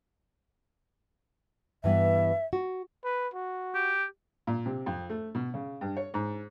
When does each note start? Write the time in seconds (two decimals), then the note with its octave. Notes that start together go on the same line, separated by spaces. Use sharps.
1.84 G2 E3 B3 E5
2.53 F#4
3.04 B4
3.34 F#4
3.75 G4
4.47 A#2
4.66 C3
4.86 F2
5.10 A3
5.35 B2
5.54 C#3
5.81 G2
5.97 C#5
6.14 G#2